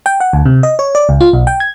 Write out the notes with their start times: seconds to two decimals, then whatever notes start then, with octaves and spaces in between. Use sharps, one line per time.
0.06 G5
0.20 F#5
0.33 D2
0.45 C3
0.63 D#5
0.79 C#5
0.95 D5
1.09 C#2
1.21 F4
1.33 B1
1.47 G5
1.60 G#6